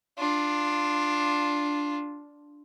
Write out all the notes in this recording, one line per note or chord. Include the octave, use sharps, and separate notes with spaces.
D4 F4